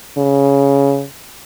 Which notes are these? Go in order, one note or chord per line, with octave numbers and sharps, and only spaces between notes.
C#3